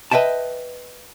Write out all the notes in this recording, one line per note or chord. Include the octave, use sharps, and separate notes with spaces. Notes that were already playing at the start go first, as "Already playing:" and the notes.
B4 D#5 E5 G5 A5